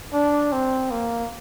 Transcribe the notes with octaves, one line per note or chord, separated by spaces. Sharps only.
D4
C4
A#3